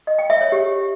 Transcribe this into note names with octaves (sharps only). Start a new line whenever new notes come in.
D#5
G5
E5
C#5
G4